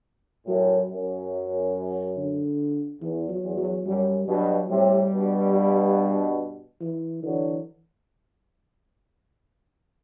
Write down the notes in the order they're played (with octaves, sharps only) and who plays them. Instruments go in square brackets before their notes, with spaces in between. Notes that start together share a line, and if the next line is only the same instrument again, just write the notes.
[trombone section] F#2 A2 [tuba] F#3
[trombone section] F#2
[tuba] D3
[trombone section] E2 [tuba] E3
[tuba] F#3
[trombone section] E2
[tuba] F#3
[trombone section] F#2 [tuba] G3
[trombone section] G2 B2 [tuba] F#3
[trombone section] A2 C3 [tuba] G3
[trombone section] G2 B2
[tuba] E3
[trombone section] D3 F#3 [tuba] E3